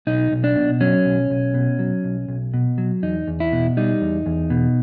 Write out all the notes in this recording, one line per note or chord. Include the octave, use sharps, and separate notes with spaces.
B1 D#4
B1
D4
B2
F#3 C#4
B1
B1
B2
F#3
B1
B1
B2
F#3
E2 D#4
E2
E4
B2
G3 D#4
E2
E2
B2